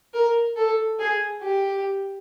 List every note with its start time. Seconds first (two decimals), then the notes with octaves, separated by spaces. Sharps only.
0.14 A#4
0.56 A4
0.99 G#4
1.41 G4